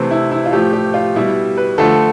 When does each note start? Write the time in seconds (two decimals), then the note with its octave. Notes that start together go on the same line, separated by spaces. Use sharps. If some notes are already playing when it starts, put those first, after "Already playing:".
Already playing: C3 E3 A3 C4
0.11 E4
0.31 E4
0.46 F4
0.52 A2 F3 A3 G4
0.73 G4
0.94 F4
1.16 B2 G3 E4
1.57 B4
1.78 D3 F3 A3 A4